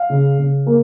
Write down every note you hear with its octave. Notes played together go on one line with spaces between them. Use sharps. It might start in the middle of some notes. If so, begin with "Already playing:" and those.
Already playing: F5
C#3
C#3
A#3